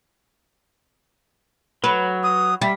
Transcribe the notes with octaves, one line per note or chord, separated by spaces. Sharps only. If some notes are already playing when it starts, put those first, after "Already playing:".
F#3 B4
D#6
G3 E5